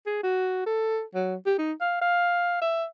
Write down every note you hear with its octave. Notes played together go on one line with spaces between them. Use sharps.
G#4
F#4
A4
F#3
G4
D#4
F5
F5
E5